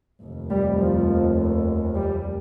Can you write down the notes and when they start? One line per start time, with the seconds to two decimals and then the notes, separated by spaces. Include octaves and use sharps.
0.22 F1 D#2
0.50 G3
0.79 F3
1.95 G3